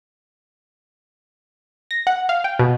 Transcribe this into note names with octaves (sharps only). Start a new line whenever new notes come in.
A#6
F#5
F5
G5
B2